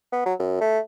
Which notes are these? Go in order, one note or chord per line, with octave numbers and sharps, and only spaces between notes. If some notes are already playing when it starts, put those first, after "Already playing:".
B3
F#3
F#2
A3